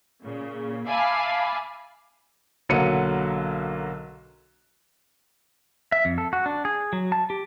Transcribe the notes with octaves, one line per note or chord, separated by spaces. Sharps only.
A#2 C#3
E5 F5 G#5 A5 B5 D6
B1 D3 F#3 A#3 C#7 D#7
E5
F2
A4
F#4
D4
G#4
F#3
A5
G4